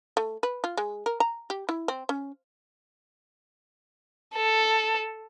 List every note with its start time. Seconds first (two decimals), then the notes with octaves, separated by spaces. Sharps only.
0.17 A3
0.43 B4
0.64 F4
0.77 G#3
1.06 A#4
1.20 A#5
1.50 G4
1.69 E4
1.88 C4
2.09 C#4
4.35 A4